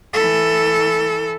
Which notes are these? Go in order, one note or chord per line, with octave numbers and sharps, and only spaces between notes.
E3 A4